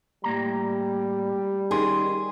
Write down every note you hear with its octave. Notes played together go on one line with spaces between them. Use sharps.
A2 G3 A#3 A#5
D#3 C#4 G#4 C6